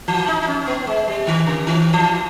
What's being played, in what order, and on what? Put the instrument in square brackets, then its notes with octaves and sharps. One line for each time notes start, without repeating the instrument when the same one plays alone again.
[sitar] E3
D#4
D#4
C#4
C#4
B3
G#3
G3
D#3
C#3
D#3
E3